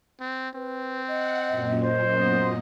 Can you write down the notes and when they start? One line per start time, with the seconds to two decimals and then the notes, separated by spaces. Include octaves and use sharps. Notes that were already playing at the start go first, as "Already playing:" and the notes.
0.20 C4
0.55 C4 B4
1.08 D#5 F#5
1.49 F#2 A#2
1.83 C5
2.19 B3 D#5